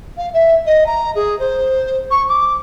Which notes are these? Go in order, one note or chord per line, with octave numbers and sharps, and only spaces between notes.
F5
E5
D#5
A#5
G#4
C5
C#6
D6